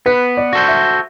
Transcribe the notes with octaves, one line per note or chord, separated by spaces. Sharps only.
B3 B4
D5
F#4 A4 C5
E5